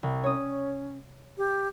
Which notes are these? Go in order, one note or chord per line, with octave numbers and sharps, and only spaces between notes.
C2
C#4 C#5 D#6
G4